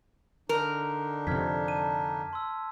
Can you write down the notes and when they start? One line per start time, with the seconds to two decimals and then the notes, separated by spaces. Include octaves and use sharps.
0.49 D3 D4 D#4 A#4
1.27 F2 C3 F6 G#6 B6
1.68 A5 D#7
2.33 C6 E6